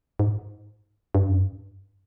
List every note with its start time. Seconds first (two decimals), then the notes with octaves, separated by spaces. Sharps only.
0.19 G#2
1.15 G2
1.28 F#2
1.42 G2